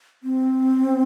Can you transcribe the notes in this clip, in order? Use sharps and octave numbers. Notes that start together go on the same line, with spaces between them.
C4